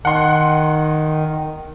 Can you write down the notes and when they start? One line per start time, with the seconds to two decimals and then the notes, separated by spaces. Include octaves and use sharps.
0.05 D#3 F#5 C6